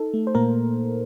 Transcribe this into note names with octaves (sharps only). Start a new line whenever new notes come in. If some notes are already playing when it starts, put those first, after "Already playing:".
Already playing: D#4 A4
A3
C5
A#2 A#3 A#4